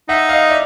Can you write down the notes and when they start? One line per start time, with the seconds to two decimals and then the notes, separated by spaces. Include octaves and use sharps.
0.09 D#4 E5 F#5
0.29 D#5 F5
0.50 D5 E5